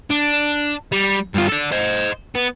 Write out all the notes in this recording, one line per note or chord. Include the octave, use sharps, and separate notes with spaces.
D4
G3
G2 F4
A4 D5
C5 D#5
B3